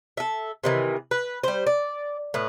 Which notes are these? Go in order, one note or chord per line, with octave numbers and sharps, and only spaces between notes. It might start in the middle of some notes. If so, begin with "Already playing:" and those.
A4 E5
C3 D#3 E3
B4
G3 C5
D5
A2 B3